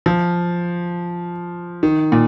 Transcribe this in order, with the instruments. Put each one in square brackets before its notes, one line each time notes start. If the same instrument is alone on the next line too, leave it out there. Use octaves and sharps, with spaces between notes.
[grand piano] F3
D#3
A#2